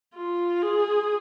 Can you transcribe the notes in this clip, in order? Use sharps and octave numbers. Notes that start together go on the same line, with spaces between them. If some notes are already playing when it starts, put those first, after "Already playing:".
F4
G#4